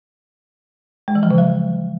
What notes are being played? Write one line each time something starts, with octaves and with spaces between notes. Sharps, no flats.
G#3
E3
F3
C#3
F#3